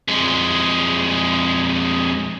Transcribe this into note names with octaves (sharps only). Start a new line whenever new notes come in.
F2 G#3